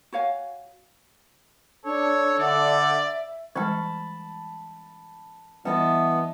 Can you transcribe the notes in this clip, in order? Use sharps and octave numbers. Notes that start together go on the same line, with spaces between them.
F#4 C#5 F5 G#5
D4 A4 C#5
D3 D5 E5
E3 G3 G#3 A5 B5
E3 G3 B3 D#5 E5 A5